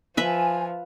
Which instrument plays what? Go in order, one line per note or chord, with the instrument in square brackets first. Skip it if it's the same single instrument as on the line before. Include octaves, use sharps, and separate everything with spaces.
[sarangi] F3 [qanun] B4 E5 [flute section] G#5